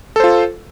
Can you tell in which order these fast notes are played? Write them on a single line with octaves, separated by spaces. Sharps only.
A4 C5 F4